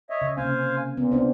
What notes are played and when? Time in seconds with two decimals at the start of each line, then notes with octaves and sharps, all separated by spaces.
0.10 C#5 D#5 E5
0.22 C#3
0.37 C3 A#3 C#4 C5 F5 G#5
0.97 A#2 B3
1.11 C4 D4 C5